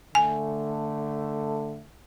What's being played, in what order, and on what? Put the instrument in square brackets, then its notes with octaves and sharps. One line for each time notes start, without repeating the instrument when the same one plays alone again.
[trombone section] D3 A3 [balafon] G#5